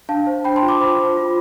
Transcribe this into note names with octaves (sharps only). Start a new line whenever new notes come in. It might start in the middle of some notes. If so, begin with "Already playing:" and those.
D4 F5 A5
C5
D4 G5 B5
A5 C6
F4
B5 D6
C5
F4
F4